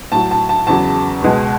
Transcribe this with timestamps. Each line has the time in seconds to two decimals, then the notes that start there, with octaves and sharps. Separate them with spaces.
0.12 A2 F#3 A5
0.31 A5
0.49 A5
0.67 E2 C#3 F#3 A5
1.22 C#2 B2 G#3